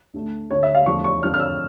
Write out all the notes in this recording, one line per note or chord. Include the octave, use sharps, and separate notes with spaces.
D2 D3 A3
D2 D3 A3 C#5
E5
F5
E2 D3 F3 A3 C#6
C#6
F2 D3 F3 F6
F6
E6